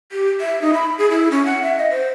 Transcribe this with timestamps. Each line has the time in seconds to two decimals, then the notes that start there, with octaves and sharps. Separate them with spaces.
0.12 G4
0.40 E5
0.62 D#4
0.73 B5
0.98 G#4
1.11 E4
1.31 C#4
1.45 F#5
1.62 E5
1.78 D#5
1.91 C5